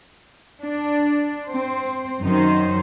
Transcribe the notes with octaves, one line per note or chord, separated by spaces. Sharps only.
D4
C4 C5
F#2 D#3 F#3 D#4 C5